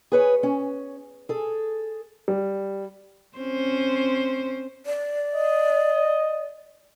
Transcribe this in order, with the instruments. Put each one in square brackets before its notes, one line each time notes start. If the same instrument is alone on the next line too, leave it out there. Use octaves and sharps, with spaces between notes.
[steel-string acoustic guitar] G#4 B4 C#5
C#4
G#4 A4
[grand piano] G3
[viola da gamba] C4 C#4 C5
[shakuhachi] D5
[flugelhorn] D#5